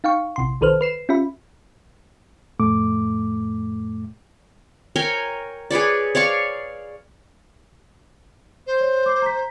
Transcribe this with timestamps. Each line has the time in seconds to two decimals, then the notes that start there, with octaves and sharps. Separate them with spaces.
0.04 D#4 F5 G5 C#6
0.36 A#1 C3 C6
0.61 B1 D#3 A4 B4 C5 F6
0.81 B4 C7 E7
1.09 C#4 F4 G4 E5 B5
2.60 F2 A2 A3 D6
4.96 A#4 C#5 G5 G#5
5.71 G#4 B4 C#5 D5
6.15 C#5 D5 F5 C#6
8.67 C5
8.80 C#5
9.06 D6
9.22 A#5 B6